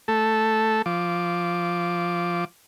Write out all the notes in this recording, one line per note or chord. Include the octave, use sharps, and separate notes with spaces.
A3 A4
F3 D6